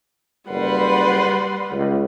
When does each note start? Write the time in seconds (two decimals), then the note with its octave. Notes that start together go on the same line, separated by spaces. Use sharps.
0.49 F#1 G3 B4 F#5 C6
1.72 C#2